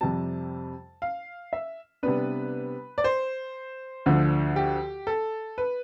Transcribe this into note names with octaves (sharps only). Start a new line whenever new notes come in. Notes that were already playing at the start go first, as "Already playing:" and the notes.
F2 C3 G3 A5
F5
E5
C3 G3 B3 D4 B4
D5
C5
D2 D3 F3
G4
A4
B4